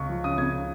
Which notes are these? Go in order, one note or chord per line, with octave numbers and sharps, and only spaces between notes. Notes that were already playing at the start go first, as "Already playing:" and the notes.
Already playing: C#2 C#6
F3
C#3 D#6
C#2 G#6